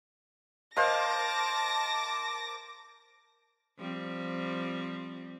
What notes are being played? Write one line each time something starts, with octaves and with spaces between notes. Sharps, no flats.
A#4 C5 D#5 F5 A5 D6 A#6
F3 G3 C4